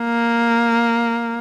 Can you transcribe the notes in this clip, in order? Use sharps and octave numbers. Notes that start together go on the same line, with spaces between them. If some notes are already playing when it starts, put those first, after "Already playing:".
Already playing: A#3